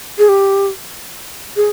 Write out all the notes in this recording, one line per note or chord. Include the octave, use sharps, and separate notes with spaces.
G#4
G4
G#4